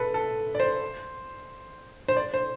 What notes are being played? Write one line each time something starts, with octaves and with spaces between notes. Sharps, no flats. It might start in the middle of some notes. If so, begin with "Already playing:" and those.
Already playing: A4 B4
A4
D5
C5
C5
D5
C5